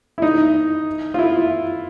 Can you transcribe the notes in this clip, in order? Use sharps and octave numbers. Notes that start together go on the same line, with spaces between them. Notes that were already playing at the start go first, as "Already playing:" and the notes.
E4
D#4
F4
E4